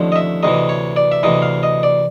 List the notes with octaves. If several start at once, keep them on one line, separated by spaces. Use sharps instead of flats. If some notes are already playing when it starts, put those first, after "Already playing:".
Already playing: D#2 D3 F3 A3 C#4
D#5
E5
D2 C3 E3 D#5
C#5
D5
E5
D2 C3 E3 D#5
F5
D#5
D5